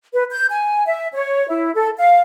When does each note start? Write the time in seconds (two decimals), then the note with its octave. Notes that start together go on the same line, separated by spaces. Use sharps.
0.13 B4
0.31 G6
0.51 G#5
0.86 E5
1.14 C#5
1.48 E4
1.75 A4
1.98 F5